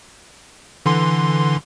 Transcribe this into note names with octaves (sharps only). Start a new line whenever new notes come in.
D3 E3 C6